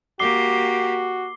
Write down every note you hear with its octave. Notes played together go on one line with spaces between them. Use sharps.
A#3 F#4 G4 D6 C7 G7